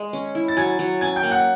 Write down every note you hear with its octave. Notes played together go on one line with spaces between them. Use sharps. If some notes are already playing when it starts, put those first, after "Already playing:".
Already playing: G#3
C#4
E4
A6
F#3 G#5 G#6
F#3
C#4 G#5 G#6
G5 G6
A#3
F#5 F#6